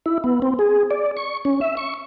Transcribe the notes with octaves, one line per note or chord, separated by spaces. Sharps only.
E4
B3
C4
G#4
D5
C#6
C#4
E5
C#6